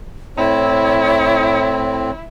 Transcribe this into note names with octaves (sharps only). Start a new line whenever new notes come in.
A2 C4 E4 C#5